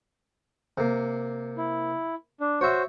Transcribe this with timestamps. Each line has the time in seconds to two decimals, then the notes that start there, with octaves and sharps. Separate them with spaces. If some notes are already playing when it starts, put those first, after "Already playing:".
0.78 C3 A#3
1.58 E4
2.40 D4
2.61 F#4 C5 C#5 E5